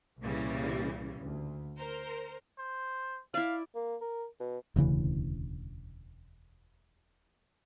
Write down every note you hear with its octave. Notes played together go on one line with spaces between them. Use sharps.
C2 A#2 C#3 E3 G3
D2
A#4 C5
C5
E4 D5 F5
A#3
A#4
B2
E1 D2 C#3 E3